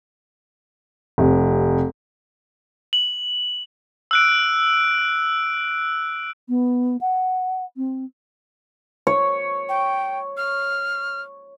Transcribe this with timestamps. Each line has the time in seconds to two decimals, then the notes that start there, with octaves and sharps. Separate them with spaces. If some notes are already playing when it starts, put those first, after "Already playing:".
1.18 F1 C3
2.93 F#7
4.11 E6 F#6 D7
6.49 B3
7.01 F#5
7.77 C4
9.07 C#5
9.69 G5
10.37 F6